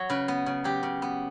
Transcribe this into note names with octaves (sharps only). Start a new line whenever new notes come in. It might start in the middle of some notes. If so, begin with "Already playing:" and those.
Already playing: F#3 C#5
C#3 B4
B3
C#3
F#3 G4
C#3
B3